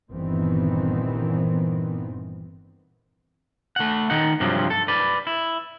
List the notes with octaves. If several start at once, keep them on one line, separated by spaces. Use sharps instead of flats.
G1 A#2 D#3 E3 B3 C4
A3 F#5
D#3 D#4 F#5
G2 C3 F3 F#3
A4
B4 D5
E4